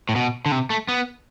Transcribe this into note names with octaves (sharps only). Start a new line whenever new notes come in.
A2
B2
D3
C3
A3
B3